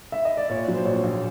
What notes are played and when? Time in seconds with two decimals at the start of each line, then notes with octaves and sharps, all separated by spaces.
0.12 E5
0.25 D#5
0.37 D5
0.49 A#2 C#5
0.68 F#3
0.74 C5
0.85 A#1 C#5
1.03 A#1